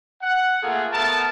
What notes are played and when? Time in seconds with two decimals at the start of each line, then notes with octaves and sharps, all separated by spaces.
0.21 F#5
0.62 A3 A#3 F4 G#4 A4
0.92 A3 B3 A#4 A5